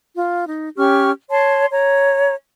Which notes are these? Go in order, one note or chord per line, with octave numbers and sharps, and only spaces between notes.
F4
D#4
C#4 G4 C#6 F6
C#5 A5 C6
C#5 A#5